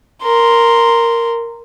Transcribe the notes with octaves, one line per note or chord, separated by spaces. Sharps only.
A#4 C6